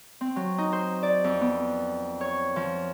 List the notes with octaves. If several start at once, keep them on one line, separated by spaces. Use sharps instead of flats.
C4
F#3
D#4
C5
D5
F2
B3
C#5
F3